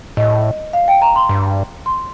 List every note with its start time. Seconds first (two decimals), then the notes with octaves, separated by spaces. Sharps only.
0.17 A2 D#5
0.73 F5
0.88 G5
1.02 A#5
1.16 C6
1.29 G2
1.86 C6